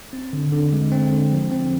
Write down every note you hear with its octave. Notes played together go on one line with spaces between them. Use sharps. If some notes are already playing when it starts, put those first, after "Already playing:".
C4
D3
D3
G#3
C4
D3
F3
C4